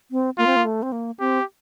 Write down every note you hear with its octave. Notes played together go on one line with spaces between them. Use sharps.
C4
A#3 F4
C4
A#3
A3
C4
A#3
C4 G4